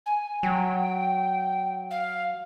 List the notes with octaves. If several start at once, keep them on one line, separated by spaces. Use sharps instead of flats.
G#5
F#3 G5
F5